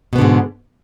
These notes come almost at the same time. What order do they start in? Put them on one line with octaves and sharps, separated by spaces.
B2 B3 D3 G#2